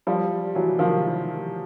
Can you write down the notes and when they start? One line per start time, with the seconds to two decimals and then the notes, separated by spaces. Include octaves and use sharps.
0.07 F3 G3
0.55 E3 F#3
0.79 D#3 F3